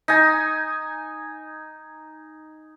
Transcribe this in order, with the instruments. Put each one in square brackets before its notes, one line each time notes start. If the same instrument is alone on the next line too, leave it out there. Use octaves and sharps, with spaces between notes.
[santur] D#4 G#5